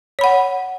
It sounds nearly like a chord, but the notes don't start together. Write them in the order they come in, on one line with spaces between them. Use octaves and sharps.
C#5 B5 F#5